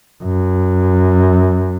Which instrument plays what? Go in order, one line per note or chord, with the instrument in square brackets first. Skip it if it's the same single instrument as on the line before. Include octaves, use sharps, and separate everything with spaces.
[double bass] F#2